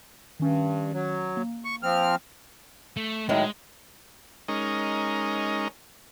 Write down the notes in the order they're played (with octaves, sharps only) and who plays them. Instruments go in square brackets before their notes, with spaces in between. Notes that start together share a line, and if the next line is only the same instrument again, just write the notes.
[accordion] G2 [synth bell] D#3 C#4
[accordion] F#3
[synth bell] A#3
[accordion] C#6
F3 C4 F6
[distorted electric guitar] A3
[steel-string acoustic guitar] A2 D#3 F#3 [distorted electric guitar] G#3
[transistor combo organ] G#3 C#4 D#4 A#4